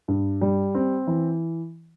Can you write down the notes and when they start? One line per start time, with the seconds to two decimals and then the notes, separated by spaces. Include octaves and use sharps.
0.08 G2
0.41 G3
0.75 C4
1.07 E3